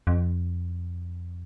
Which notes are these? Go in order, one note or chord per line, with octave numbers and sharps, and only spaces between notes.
F2